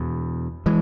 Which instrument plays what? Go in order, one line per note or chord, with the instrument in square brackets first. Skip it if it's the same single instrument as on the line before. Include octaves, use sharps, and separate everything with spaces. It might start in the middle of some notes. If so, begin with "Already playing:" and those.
Already playing: [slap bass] E2 B2
E3 G#3